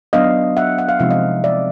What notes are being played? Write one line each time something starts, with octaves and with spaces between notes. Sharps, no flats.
F#3 B3 D4 D#5 F5
E5 F#5
F#5
F5
C3 F3 G#3 C4 D#4 E5
D#5 F5
D5 E5